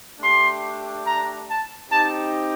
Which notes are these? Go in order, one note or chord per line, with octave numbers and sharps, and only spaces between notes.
A3 D4 G4 C6
A#5
A5
C4 D#4 G4 A5